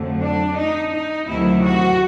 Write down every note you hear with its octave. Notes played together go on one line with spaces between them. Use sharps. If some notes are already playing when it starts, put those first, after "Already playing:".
Already playing: F2 D3 F#3 A3
D4
D#4
D#4
D2 C3 D#3 F#3 A3 E4
F#4